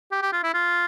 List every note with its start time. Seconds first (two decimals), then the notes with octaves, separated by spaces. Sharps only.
0.12 G4
0.22 G4
0.32 F4
0.43 E4
0.54 F4